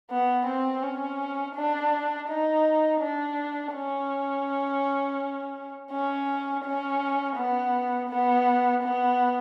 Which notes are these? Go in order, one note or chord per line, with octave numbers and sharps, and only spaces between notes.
B3
C4
C#4
D4
D#4
D4
C#4
C#4
C#4
B3
B3
B3